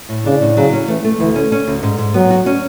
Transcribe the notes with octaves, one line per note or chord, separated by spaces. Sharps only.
A2
C#3 D4
A2
C#3 F#3
C#4
E3 A3
A3
D2 E3
C#4
C#4
D2
G#2
G#2
F#3 B3
F#4
C#4